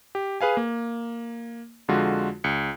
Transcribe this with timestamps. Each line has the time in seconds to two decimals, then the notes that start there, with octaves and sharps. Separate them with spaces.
0.15 G4
0.41 G#4 B4 F5 G#5
0.57 A#3
1.88 F2 D3 G#3 F4 F#4
2.44 C#2 C#7